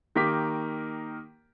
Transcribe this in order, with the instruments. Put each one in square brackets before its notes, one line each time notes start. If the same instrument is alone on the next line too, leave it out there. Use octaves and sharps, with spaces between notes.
[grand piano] D#3 A#3 G4 A#4 D6 B6